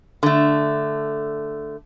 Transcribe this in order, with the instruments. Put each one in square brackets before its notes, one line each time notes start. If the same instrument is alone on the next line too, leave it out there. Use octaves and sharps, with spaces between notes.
[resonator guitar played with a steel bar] D3 A3